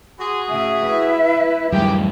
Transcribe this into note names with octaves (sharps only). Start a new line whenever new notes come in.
F#4 G#4 C6
A2 C#3 E5
E4 B4
D1 F#2 A2 E3 G3 G#3 A#3 G4